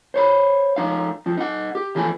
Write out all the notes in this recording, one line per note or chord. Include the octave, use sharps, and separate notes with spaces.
C5 C#5 B5
F3 D#4 F5
F2 F3
D#4 F#5
G4
E2 E3 F3 A4 G#5